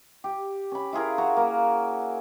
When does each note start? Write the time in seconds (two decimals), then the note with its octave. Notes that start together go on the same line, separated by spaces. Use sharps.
0.24 G4
0.72 C#4 B5
0.93 E4 F4 G#4 A#4
1.18 F#4 A#5
1.37 A#3